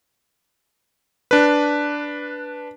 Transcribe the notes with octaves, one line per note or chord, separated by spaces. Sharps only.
D4 B4